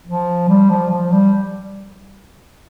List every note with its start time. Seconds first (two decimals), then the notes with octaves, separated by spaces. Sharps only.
0.07 F3
0.49 G3
0.70 F3
0.91 F3
1.12 G3